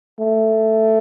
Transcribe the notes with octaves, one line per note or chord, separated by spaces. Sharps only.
A3